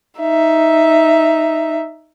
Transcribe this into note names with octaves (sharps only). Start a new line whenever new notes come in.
D#4 E5